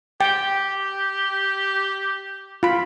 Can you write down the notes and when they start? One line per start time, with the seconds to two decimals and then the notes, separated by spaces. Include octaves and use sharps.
0.21 G4 G5
2.63 F4 B5